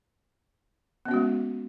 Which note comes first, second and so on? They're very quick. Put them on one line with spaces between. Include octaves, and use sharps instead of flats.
B3 C#4 F#4 G#3 A#3